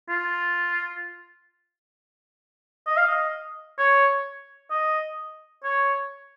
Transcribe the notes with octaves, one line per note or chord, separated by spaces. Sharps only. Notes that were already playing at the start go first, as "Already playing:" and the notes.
F4
D#5
F5
D#5
C#5
D#5
C#5